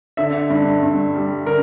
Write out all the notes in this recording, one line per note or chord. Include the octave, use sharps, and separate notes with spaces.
D3 E5
G2
G2
G3
D3 A#4